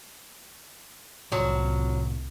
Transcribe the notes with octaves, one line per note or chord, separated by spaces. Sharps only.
C2 A2 C3 F3 F#3